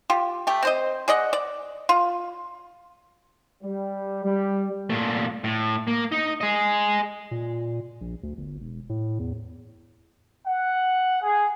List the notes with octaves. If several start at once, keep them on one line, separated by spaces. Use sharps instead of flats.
F4 G4
A3 G4
C4 C5 D#5
G#4 D5 D#5 F#5
D5
F4
G3
G3
A#2 A3
A2
A#3
D#4
G#4 D#5
A#2
A#1
D2
G1
E1
A2
E2
F#5
G#4